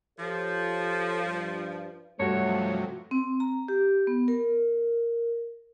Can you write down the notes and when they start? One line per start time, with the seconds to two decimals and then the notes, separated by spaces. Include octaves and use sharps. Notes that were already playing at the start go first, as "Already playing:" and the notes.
0.19 F3 G4 A4 C#5
1.25 G2
2.19 G2 C3 F3 F#3 A3 F#4 C#5
3.11 C4
3.40 A#5
3.68 G4
4.07 B3
4.28 A#4